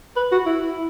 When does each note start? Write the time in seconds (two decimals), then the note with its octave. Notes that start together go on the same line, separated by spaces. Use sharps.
0.16 B4
0.32 F#4
0.46 E4